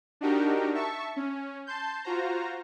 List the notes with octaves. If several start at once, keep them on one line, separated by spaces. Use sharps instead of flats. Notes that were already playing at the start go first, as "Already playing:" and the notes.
D4 D#4 F#4 G4 A#4
E5 A5 C#6
C#4
A5 C6 G6
F4 F#4 C5 A#5